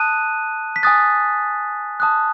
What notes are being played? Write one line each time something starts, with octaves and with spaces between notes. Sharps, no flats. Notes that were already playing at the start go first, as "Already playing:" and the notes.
Already playing: A5 D#6 F#6 D#7
B6
G#5 D#6 F#6 A6
A5 D#6 F#6